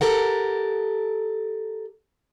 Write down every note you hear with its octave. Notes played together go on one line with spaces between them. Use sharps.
G4 A4 A#4 F#5